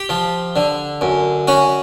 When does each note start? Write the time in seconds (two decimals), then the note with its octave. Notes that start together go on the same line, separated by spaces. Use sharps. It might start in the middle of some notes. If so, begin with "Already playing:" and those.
Already playing: G4
0.09 F3
0.56 D3
1.01 F#2
1.48 C#4 F#4